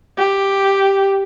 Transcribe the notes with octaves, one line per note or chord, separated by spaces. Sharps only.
G4